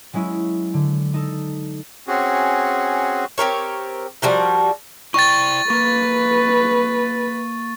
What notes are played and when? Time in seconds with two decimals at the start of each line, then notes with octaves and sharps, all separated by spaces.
0.13 F#3 G#3 C#4 E4
0.74 D3
1.14 D#4 A4
2.08 C4 C#4 F#4 G#4
3.38 C4 G4 A#4 C#5
4.22 F3 G3 F#4 A#4
5.14 E4 D5 G5 C#6 A6
5.70 A#3 B4 C#6